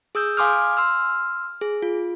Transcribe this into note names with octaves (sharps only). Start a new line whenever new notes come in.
G#4 D#6 E6 G6
F5 G#5 C6 D6 D#6 F6
C6 E6 F6
G#4
F4